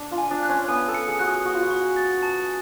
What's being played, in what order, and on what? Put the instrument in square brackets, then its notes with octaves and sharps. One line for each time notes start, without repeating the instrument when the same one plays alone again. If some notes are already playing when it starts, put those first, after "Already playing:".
Already playing: [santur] D4
F4
[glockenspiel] G#5
[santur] D4
[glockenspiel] F#6
[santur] C#4
[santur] B3 [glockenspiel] G#5
[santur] A4
[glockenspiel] C#7
[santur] G#4
[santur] F#4 [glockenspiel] F#6
[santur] G#4
[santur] F#4 [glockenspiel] C#6
[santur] F4
F#4
[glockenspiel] C#6
A6
A5